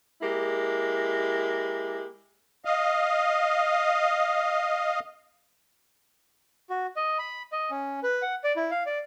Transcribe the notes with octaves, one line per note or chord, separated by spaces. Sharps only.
G#3 A#3 E4 G4
D#5 F5
F#4
D#5
B5
D#5
C#4
B4
F#5
D5
E4
F5
D5